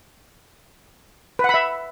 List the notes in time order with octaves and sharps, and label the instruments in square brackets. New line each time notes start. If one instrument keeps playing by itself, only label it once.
[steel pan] B4
F#5
B5
E5